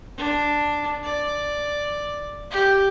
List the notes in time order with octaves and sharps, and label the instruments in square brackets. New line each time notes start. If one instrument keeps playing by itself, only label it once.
[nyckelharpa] D4
D5
G4